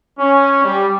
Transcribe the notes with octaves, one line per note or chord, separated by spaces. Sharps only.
C#4
G3